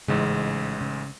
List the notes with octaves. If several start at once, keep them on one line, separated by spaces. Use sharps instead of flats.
A1 G#2 C#3 E3 G#3
C#3